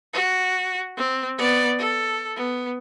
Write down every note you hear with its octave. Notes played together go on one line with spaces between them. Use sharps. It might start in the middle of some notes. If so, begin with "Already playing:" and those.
F#4
C4
B3 D5
A4
B3